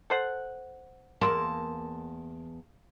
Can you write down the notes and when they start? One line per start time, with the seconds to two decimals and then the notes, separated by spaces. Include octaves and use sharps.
0.10 A4 C5 F#5
1.21 E2 G2 A#3 G#4 A5 C6 E6